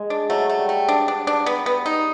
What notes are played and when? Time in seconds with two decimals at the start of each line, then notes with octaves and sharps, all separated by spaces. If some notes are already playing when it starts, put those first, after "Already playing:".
Already playing: G#3
0.10 D4
0.29 F#3 A3
0.49 A3
0.59 G3
0.69 A3
0.88 D4
1.08 D4
1.27 D4
1.46 B3
1.66 B3
1.86 D#4